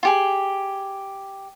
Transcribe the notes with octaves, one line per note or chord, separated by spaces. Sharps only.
F4 G4 G#4